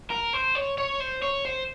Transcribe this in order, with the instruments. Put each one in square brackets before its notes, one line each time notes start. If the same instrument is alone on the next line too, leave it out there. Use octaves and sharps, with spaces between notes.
[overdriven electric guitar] A#4
C5
C#5
C#5
C5
C#5
C5